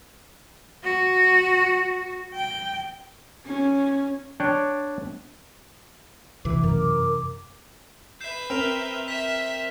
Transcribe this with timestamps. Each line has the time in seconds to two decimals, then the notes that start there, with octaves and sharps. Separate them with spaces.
0.84 F#4
2.35 G5
3.47 C#4
4.40 D4 C#5 D5 G5
6.45 C3 E3 A3 D6
6.64 F#2 A#4
8.21 B4 E5 G6 C7 E7
8.50 C4 A#4 F6 F7
9.08 E5 B6 E7